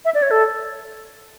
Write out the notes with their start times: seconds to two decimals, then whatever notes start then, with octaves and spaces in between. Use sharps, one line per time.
0.05 E5
0.14 D5
0.22 C#5
0.31 A4